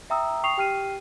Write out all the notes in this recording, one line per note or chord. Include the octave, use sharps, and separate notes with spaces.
E5 G5 A#5 D#6 E6
G5 C#6 D#6 C7 F7
G4 G5 F6 C7 D#7